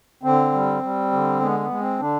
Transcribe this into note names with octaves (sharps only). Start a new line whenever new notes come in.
D3 C4
G3
G3
D3
G#3 B3
B3
G#3
C4
D3 D4